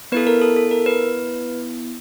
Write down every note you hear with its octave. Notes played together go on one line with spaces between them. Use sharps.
B3 E4 A4 B4
A#4
A4
A4
A#4
B4